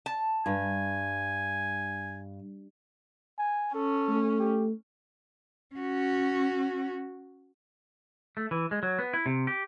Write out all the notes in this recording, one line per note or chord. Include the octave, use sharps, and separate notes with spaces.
A5
G2 G#5
G#5
C#4 A4
A3
G4
C#4 F#4
A3
E3
G#3
F#3
B3
E4
C3
G4